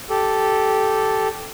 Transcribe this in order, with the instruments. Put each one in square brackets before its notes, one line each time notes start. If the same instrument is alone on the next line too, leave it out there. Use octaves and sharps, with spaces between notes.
[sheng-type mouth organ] G4 A4